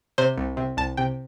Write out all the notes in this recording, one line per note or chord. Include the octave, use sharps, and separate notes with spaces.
C3 C5
C2
C3
C2 A5
C3 G5